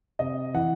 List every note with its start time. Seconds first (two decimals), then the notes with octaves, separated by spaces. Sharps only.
0.19 C3 D#5
0.54 E3 F#5